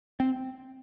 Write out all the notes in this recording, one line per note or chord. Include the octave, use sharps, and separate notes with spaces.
C4